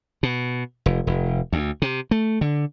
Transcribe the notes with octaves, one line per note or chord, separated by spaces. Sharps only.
B2
F1
F1
D2
C3
A3
D3